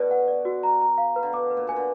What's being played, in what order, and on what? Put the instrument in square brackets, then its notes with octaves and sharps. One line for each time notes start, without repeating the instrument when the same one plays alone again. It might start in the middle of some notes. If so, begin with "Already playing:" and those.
Already playing: [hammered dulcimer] B2 D3 [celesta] B4 D5
[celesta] F#5
D5
F#4
A#5
A#5
F5
B4
[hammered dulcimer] D3
[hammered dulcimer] B2 [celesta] D6
[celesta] B4
[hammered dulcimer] A#2
[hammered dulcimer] B2 [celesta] G#5
[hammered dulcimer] D3